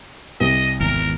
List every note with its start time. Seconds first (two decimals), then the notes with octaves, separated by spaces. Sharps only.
0.40 C2 D#5
0.81 G#1 E2 A#4